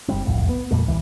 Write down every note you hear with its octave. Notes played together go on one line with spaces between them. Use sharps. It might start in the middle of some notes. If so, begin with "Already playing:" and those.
F#1 G3 C4
E1 C2 F2 A2
B3
F2 A#2 G3 A3
D1 C2 E3 G3